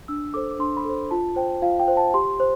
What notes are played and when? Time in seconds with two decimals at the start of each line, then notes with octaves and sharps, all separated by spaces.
0.08 D4 E6
0.34 A4 C5 D6
0.51 D6
0.59 D4 C6
0.77 B5
0.85 A4 C5
1.11 F4 A5
1.36 C5 G5
1.62 F4 F5
1.80 G5
1.88 C5
1.97 A5
2.14 G4 C6
2.40 C5